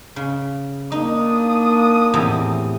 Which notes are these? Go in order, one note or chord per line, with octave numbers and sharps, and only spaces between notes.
C#3
A#3 D4 D#4 D#6
E2 A2 C3